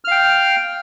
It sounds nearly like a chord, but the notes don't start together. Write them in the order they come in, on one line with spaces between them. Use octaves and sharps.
F6 F5 G5